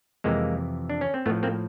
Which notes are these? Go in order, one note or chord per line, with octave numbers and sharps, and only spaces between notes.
F2 C3 E3 G#3 A#3
D4
C#4
C4
A2 F3 A3 B3
A#3 C4